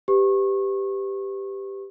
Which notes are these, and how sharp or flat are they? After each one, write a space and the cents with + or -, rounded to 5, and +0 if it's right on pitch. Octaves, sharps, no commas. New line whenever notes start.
G4 +5 B4 +35 C#6 -25